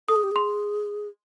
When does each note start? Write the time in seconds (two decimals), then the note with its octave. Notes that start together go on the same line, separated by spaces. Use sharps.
0.08 A4 D#6
0.16 G#4
0.23 G4
0.31 G#4 C6